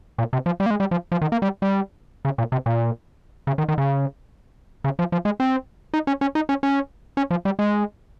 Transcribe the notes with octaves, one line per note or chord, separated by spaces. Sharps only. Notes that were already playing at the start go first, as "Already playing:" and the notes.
A#2
C3
F3
G3
A#3
G#3
G3
F3
F3
D#3
A#3
G3
G3
C#3
A#2
C3
A#2
C#3
D#3
D#3
C#3
C#3
F3
F3
G#3
C4
D#4
C#4
C#4
D#4
C#4
C#4
C#4
F3
G3
G#3